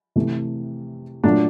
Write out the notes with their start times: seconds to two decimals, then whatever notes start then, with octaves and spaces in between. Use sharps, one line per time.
0.16 C3 E3 A3
1.24 A#2 F#3 A3 D4